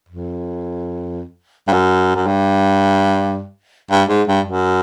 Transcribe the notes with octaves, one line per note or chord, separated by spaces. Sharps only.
F2
G2
F#2
F#2
G2
G2
G#2
G2
F#2